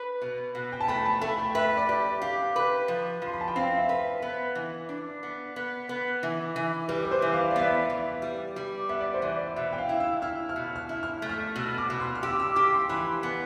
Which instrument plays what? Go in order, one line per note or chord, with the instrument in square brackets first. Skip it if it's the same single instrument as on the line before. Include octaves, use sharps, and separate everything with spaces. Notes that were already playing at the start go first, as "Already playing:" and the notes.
Already playing: [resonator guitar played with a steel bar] B4
B2
B2
[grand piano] G5
A5
[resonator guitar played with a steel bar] A3 [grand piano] B5
[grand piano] A5
[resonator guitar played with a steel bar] A3 [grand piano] B5
[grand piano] G5
[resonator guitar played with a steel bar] B4 [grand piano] E5
[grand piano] D5
[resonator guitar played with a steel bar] G4
[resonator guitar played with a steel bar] G4 [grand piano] F5
[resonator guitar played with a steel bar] B4
F3
[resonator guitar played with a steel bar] F3 [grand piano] C6
[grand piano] B5
A5
G5
[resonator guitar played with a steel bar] C4 [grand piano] F5
[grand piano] E5
[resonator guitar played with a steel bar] B4
B3
E3
D4
B3
B3
B3
E3
E3
[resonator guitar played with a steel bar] G3 [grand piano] B4
[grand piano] B4
C5
[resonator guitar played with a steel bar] E3
[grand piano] F5
E5
D5
[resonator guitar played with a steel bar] B3 [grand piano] E5
[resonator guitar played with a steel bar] E3
G3
G3
[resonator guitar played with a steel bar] B3 [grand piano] E5
[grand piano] D5
C5
[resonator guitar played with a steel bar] E3 [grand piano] D5
[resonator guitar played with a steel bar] B2 [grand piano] E5
[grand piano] G5
F5
[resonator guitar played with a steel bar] E4
[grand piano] E6
[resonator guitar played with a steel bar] E4 [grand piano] F6
[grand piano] F6
[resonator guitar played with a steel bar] B2
[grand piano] F6
[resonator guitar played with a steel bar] E4
[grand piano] F6
[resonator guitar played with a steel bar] A3
[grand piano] F6
[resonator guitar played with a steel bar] B2 [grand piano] E6
[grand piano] D6
[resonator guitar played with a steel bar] B2
[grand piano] C6
F6
[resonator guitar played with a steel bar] G4 [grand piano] E6
[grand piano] E6
[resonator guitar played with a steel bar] G4 [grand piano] E6
[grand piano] C6
[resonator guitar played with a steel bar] E3 [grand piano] B5
[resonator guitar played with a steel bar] B3